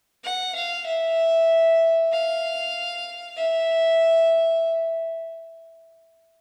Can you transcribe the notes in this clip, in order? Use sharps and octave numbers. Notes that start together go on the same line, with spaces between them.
F#5
F5
E5
F5
E5